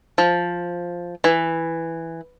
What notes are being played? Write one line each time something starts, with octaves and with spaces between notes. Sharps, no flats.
F3
E3